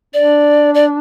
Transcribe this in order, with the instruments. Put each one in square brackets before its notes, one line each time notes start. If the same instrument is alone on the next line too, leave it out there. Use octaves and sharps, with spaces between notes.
[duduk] D4 [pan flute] D5
[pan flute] D5